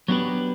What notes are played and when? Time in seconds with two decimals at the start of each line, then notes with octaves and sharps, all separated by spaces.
0.08 F#3 B3 D4 G4 B4